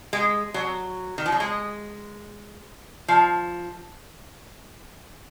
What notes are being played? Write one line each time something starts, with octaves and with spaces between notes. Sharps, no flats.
G#3
F#3
D#3
F3
F#3
G#3
F3